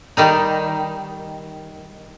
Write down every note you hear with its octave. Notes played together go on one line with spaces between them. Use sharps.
D#3 G3 D#4